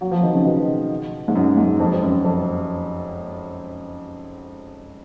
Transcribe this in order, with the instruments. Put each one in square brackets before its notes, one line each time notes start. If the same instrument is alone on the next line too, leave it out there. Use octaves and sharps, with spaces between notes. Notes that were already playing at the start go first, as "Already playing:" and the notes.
[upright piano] F#3
F3
D#3
C#3
B2
G#2
F#2
G#2
F2
F2
F#2
F2